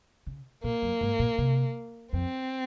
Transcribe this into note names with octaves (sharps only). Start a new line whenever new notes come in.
C#3
A#2 A#3
F#2
G#2
A#2
C3
F2 C4